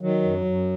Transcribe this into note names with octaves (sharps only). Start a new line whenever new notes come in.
D#3 F#3
F#2
F#2